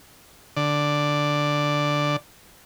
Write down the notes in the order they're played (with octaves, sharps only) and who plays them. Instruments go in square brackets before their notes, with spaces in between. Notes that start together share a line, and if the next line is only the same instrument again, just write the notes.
[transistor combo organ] D3 D5